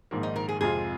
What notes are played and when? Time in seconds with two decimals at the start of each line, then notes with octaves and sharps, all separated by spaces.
0.11 A#1 G#2 D#3 A#3
0.23 D#4
0.36 A#4
0.49 G#4
0.61 F2 C3 G#3 F4 G#4